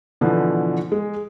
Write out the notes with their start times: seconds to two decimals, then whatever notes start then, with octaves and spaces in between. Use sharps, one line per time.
0.21 B2 D3 E3 F3
0.92 G#3